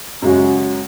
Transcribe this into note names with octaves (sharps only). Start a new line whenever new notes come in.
F#2 C#3 G#3 C#4 F#4